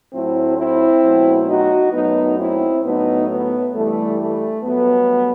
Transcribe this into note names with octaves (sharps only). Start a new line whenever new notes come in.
A2 F#3 A3 C4 E4
C4 E4
B2 F#3 A3
D#4 F#4
F#2 F#3 A3 B3 D#4
C4 E4
A2 F#3 A3 B3 D#4
B3
G2 E3 G3 A3
A3
G2 F#3 A3 B3